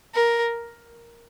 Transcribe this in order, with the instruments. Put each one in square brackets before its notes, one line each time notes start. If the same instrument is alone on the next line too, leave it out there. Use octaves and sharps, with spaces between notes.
[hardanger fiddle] A#4